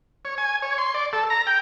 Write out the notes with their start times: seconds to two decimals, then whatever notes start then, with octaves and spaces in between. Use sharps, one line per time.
0.25 C#5
0.38 G#5
0.62 C#5
0.78 C6
0.95 D5
1.13 A4
1.30 A#5
1.47 G5